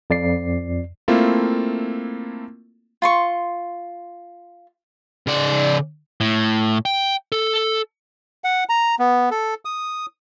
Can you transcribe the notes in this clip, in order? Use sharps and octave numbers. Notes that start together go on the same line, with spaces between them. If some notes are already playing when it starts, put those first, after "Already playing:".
F2 D5 C7
A3 A#3 C4 E4 F4 A4
F4 C6 C#6
C#3 D5
A2
G5
A4
F#5
A#5
B3
A4
D#6